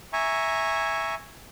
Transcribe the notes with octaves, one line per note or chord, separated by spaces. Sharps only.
E5 G#5 A#5 C#6